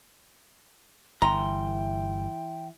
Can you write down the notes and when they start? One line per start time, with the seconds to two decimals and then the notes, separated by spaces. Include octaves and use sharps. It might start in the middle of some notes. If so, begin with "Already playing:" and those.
1.22 G1 E3 G5 A#5 C6